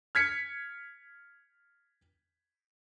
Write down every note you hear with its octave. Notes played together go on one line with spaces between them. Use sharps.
F6 G#6 B6 C#7